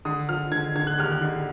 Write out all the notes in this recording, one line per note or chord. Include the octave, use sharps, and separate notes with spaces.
D3 D#6
F3 F6
D3 G#6
D3 G#6
F#6
D#2 F6
F#6
D3